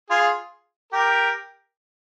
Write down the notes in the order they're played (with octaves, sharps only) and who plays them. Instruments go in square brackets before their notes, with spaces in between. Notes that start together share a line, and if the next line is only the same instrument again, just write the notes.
[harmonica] F4 G#4
G4 A#4